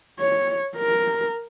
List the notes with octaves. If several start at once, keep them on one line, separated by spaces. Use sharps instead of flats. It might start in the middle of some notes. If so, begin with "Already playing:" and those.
C#5
A#4